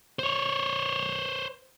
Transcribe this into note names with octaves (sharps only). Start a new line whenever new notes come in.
C5 C#5